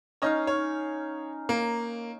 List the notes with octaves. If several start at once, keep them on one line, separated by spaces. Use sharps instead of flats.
C#4 D#4 C#5 D#5 F5
C#5
A#3